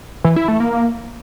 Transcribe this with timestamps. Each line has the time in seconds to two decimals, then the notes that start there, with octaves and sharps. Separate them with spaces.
0.24 E3
0.36 E4
0.48 A3
0.60 A#3